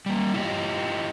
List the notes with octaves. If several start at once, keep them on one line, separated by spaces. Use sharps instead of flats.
G3 A#3
E4 F4 G4 B4 D#5